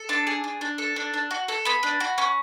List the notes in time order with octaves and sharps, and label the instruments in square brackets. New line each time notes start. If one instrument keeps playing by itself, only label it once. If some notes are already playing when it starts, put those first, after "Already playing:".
Already playing: [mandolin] A4
D4 A5
G#4
D4
D4
A4
D4
D4
F#4
A4
B3 B5
D4
F#4
C#4